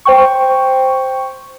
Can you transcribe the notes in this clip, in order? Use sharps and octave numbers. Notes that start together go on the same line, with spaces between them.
C5 G5 C#6